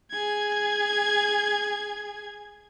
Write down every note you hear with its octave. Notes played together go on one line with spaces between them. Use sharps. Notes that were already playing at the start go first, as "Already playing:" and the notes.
G#4 G#6